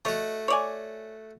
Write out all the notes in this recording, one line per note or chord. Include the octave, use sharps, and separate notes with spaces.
A3 F#4 C#5 D#5
C#5 D5 G#5